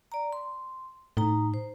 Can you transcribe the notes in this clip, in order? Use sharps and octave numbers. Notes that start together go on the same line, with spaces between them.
D5 A#5
C6
A2 D#4 A#5
C5